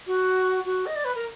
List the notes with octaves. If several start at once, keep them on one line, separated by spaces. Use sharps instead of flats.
F#4
F#4
D#5
D5
B4
A#4